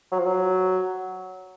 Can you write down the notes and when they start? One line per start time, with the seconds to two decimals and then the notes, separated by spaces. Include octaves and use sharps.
0.12 F#3
0.19 F3
0.26 F#3